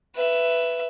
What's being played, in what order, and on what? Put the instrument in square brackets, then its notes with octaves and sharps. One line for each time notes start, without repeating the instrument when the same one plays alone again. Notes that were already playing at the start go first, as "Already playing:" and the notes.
[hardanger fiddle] B4 E5